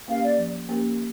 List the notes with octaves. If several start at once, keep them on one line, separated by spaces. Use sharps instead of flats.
A#3 C#4 G4 A#4 F5
D5
F3
A#3 C#4 G4 A#4